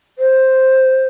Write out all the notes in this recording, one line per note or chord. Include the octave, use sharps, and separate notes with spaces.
C5